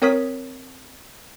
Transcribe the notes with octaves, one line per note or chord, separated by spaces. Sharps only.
C4 A#4 C#5 D#6 B6